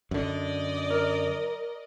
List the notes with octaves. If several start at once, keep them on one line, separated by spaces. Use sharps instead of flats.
F#2 D3 D5 D#5
A#4